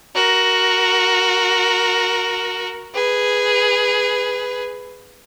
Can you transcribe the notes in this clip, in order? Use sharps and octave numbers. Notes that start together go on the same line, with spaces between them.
F#4 A#4
G#4 B4